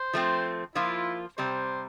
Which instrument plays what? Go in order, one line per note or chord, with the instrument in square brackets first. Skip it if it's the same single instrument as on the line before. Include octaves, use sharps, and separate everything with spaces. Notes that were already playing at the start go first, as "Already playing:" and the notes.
Already playing: [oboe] C5
[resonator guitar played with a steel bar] F3 A3 C4
[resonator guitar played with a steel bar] F3 A#3 F4 [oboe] E4
[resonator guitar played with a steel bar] C3 G3 C4 [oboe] C5